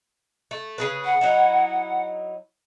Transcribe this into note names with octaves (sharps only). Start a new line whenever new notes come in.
A3
C#3 G#4 B4
F#5
F#3 D#4 E4